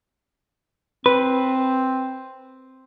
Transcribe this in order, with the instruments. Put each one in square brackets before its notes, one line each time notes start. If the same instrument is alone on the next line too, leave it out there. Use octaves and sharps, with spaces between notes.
[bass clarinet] C4 [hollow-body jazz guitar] B4